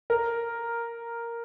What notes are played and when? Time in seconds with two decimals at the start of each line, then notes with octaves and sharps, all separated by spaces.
0.10 A#4